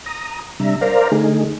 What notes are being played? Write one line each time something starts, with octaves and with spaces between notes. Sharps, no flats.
A#5 D#6
C3 G3 D4 E5 A#5
A#4 C5 D5 F5 A#5
D3 A3 D#4 G#4